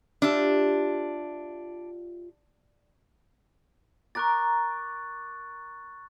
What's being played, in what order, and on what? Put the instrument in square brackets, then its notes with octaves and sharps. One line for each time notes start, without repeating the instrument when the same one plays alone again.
[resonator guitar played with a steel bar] D4 [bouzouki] F4 G4 E5
[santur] A#4 A#5 D6 [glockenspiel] C#6 F#6 A6